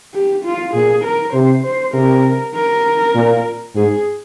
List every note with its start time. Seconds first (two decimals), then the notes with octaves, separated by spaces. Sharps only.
0.14 G4
0.44 F4
0.74 A#2 G#4
1.05 A#4
1.34 C3 C5
1.64 C5
1.94 C3 A#4
2.55 A#4
3.15 A#2
3.76 G#2 G#4